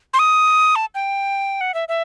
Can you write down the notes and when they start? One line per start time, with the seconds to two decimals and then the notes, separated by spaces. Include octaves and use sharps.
0.13 C6
0.19 D#6
0.76 A5
0.95 G5
1.61 F#5
1.74 E5
1.88 E5